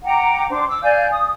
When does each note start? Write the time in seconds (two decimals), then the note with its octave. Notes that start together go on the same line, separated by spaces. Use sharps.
0.03 F#5 G5 A#5 D6
0.50 D4 C5 D6
0.68 D6 E6
0.82 D5 F5 G#5 G6
1.11 D#6